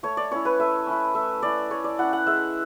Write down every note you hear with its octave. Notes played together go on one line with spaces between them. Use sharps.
A3 C#5
D5
C#4 E4 C#5
B4
A3 E5
C#4 E4
A3 E5
C#4 E4 D5
A3 C#5
D5
C#4 E4 F#5
F#5
G#3 E5